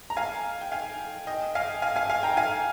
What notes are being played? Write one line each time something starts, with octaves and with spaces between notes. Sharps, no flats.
A#5
F5 G#5
G5
F5 G#5
D#5 G5
F5 G#5
F5 G#5
F5 G#5
F5 G#5
G5 A#5
F5 G#5